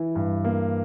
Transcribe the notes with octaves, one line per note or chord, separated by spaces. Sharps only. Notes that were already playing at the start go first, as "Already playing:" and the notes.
Already playing: E3 E4
G2
A#3